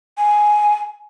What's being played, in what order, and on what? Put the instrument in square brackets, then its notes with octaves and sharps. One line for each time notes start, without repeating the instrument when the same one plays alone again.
[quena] G#5